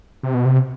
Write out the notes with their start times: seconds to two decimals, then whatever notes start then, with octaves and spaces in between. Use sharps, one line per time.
0.23 C3
0.34 B2
0.45 C3